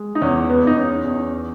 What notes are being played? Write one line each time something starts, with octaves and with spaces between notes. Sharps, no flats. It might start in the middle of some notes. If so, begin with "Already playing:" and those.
Already playing: G#3
D#4
E2 C#4
B3
E2 D#4
C#4
E2